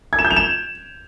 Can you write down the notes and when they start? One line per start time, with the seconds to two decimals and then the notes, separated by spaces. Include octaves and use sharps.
0.13 G#6
0.19 E7
0.25 G6
0.31 F7
0.36 E7